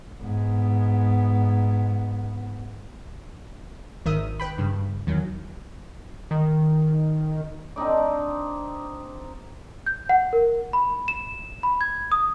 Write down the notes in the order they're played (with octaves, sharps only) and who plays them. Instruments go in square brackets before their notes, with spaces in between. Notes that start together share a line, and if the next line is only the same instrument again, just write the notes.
[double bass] G#2 B3
[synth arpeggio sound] G#1 D#3 A#4 E5 D#6
B4 G5 B5
G2 C#3
E2 D#3 F#3
[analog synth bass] D#3
[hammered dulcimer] C4 D4 D#4 D5
[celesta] G6
F#5
A#4
B5
E7
B5
G#6
D#6